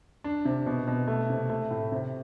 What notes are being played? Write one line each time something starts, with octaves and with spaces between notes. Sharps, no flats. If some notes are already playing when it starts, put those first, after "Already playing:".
D4
C3
B2
B2
A3
C3
A3
A2
C3